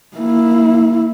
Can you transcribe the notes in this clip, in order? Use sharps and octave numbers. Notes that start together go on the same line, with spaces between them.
A#3 E4